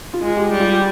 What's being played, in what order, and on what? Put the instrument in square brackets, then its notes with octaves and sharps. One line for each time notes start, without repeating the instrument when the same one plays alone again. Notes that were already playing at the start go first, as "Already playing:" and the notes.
[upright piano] F4
[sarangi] G#3
[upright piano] G4
[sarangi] G3
[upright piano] F4